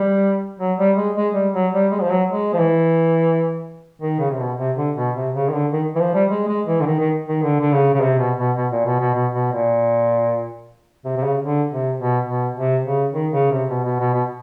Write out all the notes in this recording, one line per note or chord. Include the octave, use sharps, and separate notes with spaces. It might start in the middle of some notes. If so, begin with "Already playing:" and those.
Already playing: G3
F#3
G3
G#3
G#3
G3
F#3
G3
G#3
F3
F#3
G#3
F3
E3
D#3
C#3
C3
B2
C3
D3
B2
C3
C#3
D#3
D3
D#3
E3
F3
G3
G#3
G#3
E3
D3
D#3
D#3
D#3
D3
D3
C#3
C#3
C3
B2
B2
B2
A#2
B2
B2
B2
B2
A#2
C3
C3
C#3
D3
C3
B2
B2
C3
C#3
D#3
C#3
C3
B2
B2
B2
B2